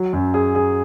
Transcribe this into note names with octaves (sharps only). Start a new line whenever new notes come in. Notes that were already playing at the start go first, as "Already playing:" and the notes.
Already playing: F#3
F#2
G#4
G#4